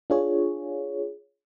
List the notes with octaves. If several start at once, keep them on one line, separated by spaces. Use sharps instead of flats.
D4 F4 G#4 C#5